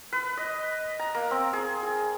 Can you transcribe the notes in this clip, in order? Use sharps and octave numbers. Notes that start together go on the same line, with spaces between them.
B4
D#5
A#5
A#3
C4
G#4
G#4